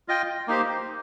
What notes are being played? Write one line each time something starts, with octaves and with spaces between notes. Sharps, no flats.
F4 D#5 G5
A#3 D#4 G4 C5